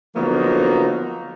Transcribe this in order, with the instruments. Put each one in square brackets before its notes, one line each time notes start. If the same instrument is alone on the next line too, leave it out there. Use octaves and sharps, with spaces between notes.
[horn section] D3 F3 F#3 A#3 B3 D#4